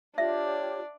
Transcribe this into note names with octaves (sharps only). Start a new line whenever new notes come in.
D4 F4 G4 C#5 E5